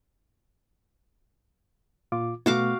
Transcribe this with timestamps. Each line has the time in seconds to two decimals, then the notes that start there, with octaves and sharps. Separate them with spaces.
2.12 A#2 F4 D6
2.46 B2 A3 B3 F#4 F5 D6